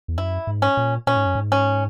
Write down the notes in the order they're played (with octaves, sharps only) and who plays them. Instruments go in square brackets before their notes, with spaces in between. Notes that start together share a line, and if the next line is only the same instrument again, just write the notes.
[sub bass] E2
[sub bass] F#2 [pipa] E4
[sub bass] G#2
[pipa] C#4
[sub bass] A#2
[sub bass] A#2 [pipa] C#4
[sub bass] G#2
F#2
G#2
[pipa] C#4